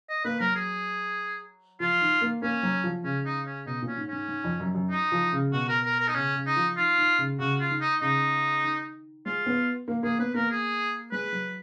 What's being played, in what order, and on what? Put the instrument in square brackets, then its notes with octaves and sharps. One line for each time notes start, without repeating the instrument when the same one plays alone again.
[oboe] D#5
[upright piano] A#3 [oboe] B4
[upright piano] F#3 [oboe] A#4
[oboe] G#4
[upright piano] F3 [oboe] F4
[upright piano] D#3
A#3
[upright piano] A#3 [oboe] C#4
[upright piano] F#3
F3
[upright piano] C#3 [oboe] C#4
[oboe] D#4
C#4
[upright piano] B2 [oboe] D#4
[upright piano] A#2
[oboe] C#4
[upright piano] G#2
[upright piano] G#2 [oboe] C#4
[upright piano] G#2
F2
F#2
F#2
[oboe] D#4
[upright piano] F3
C#3
[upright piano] B2 [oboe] F#4
[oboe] A#4
A#4
A#4
D#4
[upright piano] C#3 [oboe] C#4
[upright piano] C#3
[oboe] D#4
[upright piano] F3
[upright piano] D#3 [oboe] F4
[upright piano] D#3
C#3
[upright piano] C#3 [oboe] F#4
[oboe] F4
[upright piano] D#3
[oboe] D#4
[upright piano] C#3 [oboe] D#4
[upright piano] D#3
[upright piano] G#3 [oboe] F4
[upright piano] B3
A#3
[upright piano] A#3 [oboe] G#4
[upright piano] B3 [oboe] B4
[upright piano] A#3 [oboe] A#4
[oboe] G#4
[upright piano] G#3 [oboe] B4
[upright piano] F#3